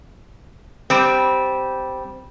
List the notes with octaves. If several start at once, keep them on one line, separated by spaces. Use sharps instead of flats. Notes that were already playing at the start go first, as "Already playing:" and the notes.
G3 C4